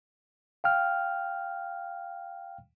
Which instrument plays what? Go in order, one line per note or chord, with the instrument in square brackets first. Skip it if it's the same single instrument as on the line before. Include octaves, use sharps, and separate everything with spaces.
[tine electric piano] F5 G5 F6